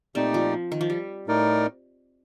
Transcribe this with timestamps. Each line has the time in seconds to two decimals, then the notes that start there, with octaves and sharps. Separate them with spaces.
0.15 A#2 A3 C4 D#4 G4 D5
0.34 F3
0.72 D#3
0.81 F3
0.90 G3
1.27 A2 A3 D#4 A#4 D5